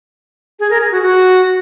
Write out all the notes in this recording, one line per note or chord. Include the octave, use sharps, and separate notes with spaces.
G#4
A#4
G#4
F#4
F#4